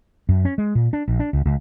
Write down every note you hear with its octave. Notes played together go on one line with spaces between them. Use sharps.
F#2
C#4
G#3
A#2
D4
A#1
D4
C#2
C#2